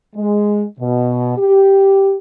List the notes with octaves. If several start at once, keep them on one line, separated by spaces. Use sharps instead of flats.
G#3
B2
G4